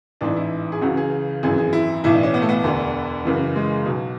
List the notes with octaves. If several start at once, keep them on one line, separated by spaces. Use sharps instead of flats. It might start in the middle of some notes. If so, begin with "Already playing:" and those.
A1 G#2 E3 D4
E4
G#4
C#2 C#3 E3 F#4
G#4
G#1 F#2 E3 G#4
G#4
E4
B1 A2 E3 E4
D4
C#4
B3
A3
B3
E1 D2 D3
F#1 F#2 C#3 E3
G#3
B1 B2 F#3